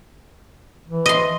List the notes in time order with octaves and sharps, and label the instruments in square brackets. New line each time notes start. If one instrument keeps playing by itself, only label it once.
[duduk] E3
[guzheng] D#5 C6